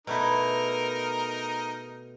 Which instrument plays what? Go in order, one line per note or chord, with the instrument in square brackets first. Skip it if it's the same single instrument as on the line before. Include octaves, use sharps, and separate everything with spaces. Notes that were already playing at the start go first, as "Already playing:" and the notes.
[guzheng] B2 A3 E4 [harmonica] D#4 A#4